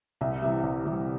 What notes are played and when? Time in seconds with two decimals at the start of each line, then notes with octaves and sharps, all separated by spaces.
0.21 C2 E5
0.42 C3 E3 G3 E5
0.63 C2
0.86 C3 E3 G3